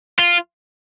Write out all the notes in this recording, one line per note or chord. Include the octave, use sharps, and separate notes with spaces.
F4